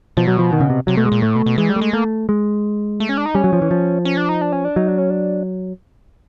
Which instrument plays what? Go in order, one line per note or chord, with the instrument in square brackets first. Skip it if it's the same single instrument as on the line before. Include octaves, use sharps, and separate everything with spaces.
[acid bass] B2 [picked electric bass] F3
[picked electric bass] F#3
F3
D#3
C#3
C3
[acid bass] C3 [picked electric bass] F#3
[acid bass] B2 [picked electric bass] A3
[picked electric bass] G#3
[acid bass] A#2
[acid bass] A2 [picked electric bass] A3
[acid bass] B2
B2
[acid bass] E3 [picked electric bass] G#3
[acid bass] G3
[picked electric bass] A3
[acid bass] G#3
[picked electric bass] A3 [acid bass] A#3
[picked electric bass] G#3
[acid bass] A3
C#4
D4
D#4
[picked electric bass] G3 [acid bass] C#4
[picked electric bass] F#3
F3
E3
F3
[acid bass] C#4
D4
D#4
D4
C#4
D4
[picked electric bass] F#3 [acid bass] D#4
[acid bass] D4
C#4
D4